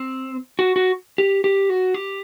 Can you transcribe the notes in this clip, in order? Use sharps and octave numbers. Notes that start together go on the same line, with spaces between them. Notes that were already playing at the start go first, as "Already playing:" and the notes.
Already playing: C4
F#4
F#4
G4
G4
F#4
G4